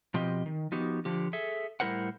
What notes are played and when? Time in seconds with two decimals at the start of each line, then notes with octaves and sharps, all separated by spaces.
0.14 B2 F3 C4 G4 D#5
0.46 D#3
0.72 F3 B3 D#4 F#4 G4
1.05 D3 F3 G4
1.33 G#4 A4 E5
1.80 A2 G3 E4 A#4 C5 F#5